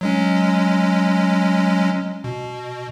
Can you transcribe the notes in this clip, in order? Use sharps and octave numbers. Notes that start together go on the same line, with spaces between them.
F#3 G#3 C#4
B2